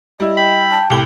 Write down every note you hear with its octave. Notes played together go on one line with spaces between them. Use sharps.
G3 E4 D#5
G5 B5
A5
C2 A2 G4 G7